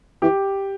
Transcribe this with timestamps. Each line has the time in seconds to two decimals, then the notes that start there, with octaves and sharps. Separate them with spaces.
0.22 E3 G4